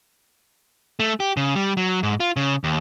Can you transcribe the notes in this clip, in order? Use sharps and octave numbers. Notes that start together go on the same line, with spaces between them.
A3
G4
C#3
G3
F#3
G#2
F4
C#3
D#2